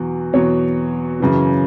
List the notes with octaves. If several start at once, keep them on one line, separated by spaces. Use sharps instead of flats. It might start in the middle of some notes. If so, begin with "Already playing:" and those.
Already playing: E2 B2 F#3
E2 B2 F#3 C#5
F#2 C#3 E3